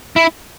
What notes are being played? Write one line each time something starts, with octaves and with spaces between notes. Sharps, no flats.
E4